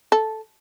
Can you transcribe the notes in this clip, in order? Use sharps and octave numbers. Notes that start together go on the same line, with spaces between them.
A4